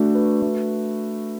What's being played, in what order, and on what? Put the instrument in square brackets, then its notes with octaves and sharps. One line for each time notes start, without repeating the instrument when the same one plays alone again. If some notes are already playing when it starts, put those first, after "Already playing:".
Already playing: [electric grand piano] A3 D4 F#4
B4
A3